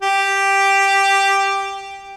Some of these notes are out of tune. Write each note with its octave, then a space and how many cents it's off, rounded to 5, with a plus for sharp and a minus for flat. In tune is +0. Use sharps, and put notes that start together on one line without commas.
G4 +5